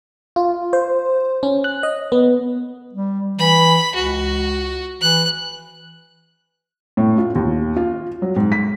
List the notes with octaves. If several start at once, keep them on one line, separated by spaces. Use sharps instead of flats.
F4
C5
C#4
F#6
D#5
B3
G3
E3 B5
C#2 F#4
E3 F#6
A2
F4
D#2
F4
F#3
G#2
B6